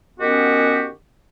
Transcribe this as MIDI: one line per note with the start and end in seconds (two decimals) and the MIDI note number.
0.19 0.88 51
0.19 0.88 59
0.19 0.88 61
0.19 0.88 66
0.19 0.88 67